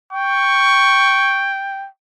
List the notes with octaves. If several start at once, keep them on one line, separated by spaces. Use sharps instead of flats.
G5 C#6